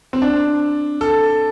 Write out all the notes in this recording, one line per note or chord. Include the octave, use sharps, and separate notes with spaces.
C4
D4
A4